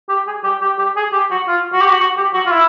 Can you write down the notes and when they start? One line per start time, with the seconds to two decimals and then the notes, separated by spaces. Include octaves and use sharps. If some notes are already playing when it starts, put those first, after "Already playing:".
0.09 G4
0.27 G#4
0.44 G4
0.61 G4
0.79 G4
0.96 G#4
1.13 G4
1.31 F#4
1.48 F4
1.73 F#4
1.81 G4
1.89 F#4
1.99 F#4
2.17 G4
2.34 F#4
2.46 F4
2.52 E4